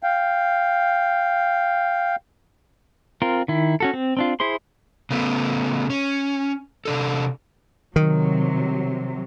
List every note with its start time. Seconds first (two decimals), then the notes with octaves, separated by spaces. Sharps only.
0.03 F5 G5
3.22 C4 F4 A#4
3.48 D#3 E4
3.80 C#4 F#4 A4
3.94 C4
4.17 C4 D4 F4
4.40 E4 G#4 C5 C6
5.10 C#3 A3 B3
5.90 C#4
6.85 C3 D4 A4
7.96 C3 D#3 F#3